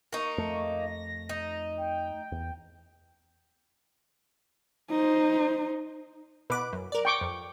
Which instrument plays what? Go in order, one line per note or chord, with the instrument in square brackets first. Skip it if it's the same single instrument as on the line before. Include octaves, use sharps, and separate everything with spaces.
[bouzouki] A#3 D#4 [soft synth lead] C#6
[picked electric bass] F2 A3
[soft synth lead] A#6
[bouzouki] D#4
[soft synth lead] G5
[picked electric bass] E2
[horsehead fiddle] D#4 C5
[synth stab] B2 D6 [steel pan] B4
[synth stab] F#2
A#4 D5
[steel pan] G5 C#6 D6
[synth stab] F2